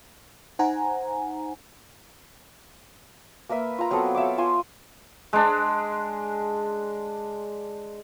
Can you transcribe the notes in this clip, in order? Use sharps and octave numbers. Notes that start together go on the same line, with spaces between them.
D#4 C5 F#5 G#5 A#5
A#3 A#4 B4 E5
F4 A#5
F#3 B3 C4 A4
C#5 E5 F5 D6
F4 G#5 C6
G#3 D4